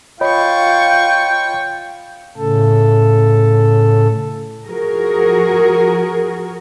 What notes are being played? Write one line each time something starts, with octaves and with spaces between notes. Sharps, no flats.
F4 C#5 D#5 G5 B5 C#6
A2 C#3 A4
F3 F#4 G#4 A#4